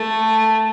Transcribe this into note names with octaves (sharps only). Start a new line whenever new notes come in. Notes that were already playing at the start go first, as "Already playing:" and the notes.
Already playing: A3